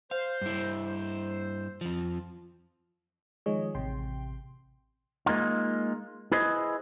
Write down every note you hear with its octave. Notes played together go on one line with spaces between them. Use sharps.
C5 F5
G2 E4
C5
F2 F3
D#3 F3 G#3 G#4 C#5 D#5
A1 C3 G5 C6
G#3 A#3 D#4 F4
E4 G#4 B4 C5 D#5